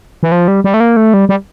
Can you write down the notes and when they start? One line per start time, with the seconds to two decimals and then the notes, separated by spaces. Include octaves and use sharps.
0.23 E3
0.32 F3
0.48 G3
0.64 G3
0.74 A3
0.80 A#3
0.97 A3
1.14 G3
1.29 G3